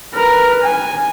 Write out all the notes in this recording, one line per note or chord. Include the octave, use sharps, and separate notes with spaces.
A#4 B4
G#5